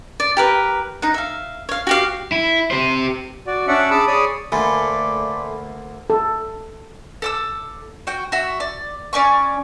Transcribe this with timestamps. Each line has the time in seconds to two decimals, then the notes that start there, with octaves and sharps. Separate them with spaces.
0.20 D5
0.37 G4 A#4 B4
1.02 D#4 F#5
1.14 E5 F5
1.69 C#5 F5
1.87 F#4 G4 F5
2.32 E4
2.71 G4 C5
3.47 F#4 D5
3.67 C#4 D4 D5 E5 F#5 C#6
3.90 G#4 A5 B5 D6 E6
4.07 G#4 C#5 D5 B5 C#6 D#6
4.52 D2 D3 A3 A#3 D5 G#5 B5 C6
6.10 A4
7.22 A4 D6 E6
8.07 F#4 G5
8.32 F#4 E5
8.60 D5
9.13 C#4 D5 G#5 C#6